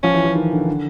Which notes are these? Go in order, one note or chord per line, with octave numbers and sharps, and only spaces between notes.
F3 C#4
E3
E3
D#3
D3
D3